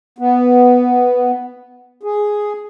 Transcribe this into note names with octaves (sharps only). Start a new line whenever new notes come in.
B3
G#4